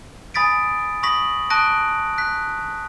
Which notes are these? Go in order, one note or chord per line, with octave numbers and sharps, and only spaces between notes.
G#5 B5 D#6 A6 B6 D7
B5 C#6 D#6 A#6 B6 F#7
A5 C#6 D#6 F#6 A#6 D7
F#6 B6